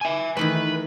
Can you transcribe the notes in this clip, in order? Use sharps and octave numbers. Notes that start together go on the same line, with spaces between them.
E5 G#5
D#3 E3 A3 B4